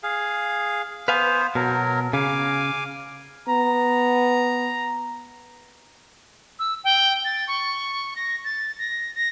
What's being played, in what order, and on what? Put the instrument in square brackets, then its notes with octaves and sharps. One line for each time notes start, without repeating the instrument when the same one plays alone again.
[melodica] G#4 F5
[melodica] B3 C5 [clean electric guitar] B4 F5 G#5
[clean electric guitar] B2 [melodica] F#3 A#4
[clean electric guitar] C#3 [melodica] F5 G#5 D6
[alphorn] B3 [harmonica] A#5
[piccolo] E6
G5
A6
C#6
A#6
A6
A#6
A#6